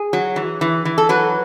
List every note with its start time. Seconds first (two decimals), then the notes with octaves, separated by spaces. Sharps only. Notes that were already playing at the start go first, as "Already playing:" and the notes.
Already playing: G#4
0.13 F#3
0.36 E3
0.61 E3
0.85 E3
0.98 A4
1.09 F#3 B4